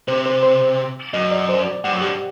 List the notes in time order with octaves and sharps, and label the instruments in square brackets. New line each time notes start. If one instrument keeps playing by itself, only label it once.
[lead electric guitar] C3 [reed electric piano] C5
[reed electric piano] C5
C5
[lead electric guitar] F#2 [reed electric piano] D#5
[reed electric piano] D5
C5
D5
[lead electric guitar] G2 [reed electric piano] F#5
[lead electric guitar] F#2
[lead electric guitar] G2 [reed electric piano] G4